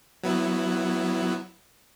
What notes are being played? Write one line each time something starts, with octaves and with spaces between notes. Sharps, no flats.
F#3 B3 E4